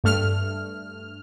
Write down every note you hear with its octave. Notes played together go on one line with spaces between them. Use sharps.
G2 A3 F6